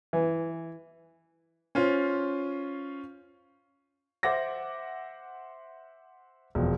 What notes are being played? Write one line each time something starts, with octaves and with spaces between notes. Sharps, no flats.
E3
C#4 F4 C5
C5 E5 F#5 D6 A#6
E1 F2